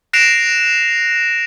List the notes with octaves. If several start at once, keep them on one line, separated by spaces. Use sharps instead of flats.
F#6 A#6 C7 D7 E7 F7